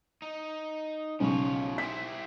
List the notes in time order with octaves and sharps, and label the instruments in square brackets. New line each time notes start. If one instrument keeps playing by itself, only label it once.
[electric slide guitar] D#4
[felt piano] B1 C#3 [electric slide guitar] F3 F4 C#5
[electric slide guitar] E4 G4 C5 [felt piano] B6